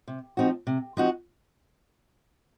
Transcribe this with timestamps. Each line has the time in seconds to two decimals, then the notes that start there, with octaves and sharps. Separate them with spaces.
0.08 C3
0.37 F3 C4 D#4 F#4
0.67 C3
0.97 F3 C4 D#4 F#4